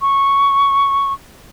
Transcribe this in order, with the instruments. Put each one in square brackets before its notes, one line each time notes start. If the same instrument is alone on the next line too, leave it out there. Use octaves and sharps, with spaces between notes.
[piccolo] C#6